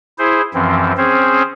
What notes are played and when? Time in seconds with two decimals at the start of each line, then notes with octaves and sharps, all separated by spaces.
0.19 E4 G#4 C5
0.54 F#2 E3 F3 C4
0.97 C4 C#4 G#4 C5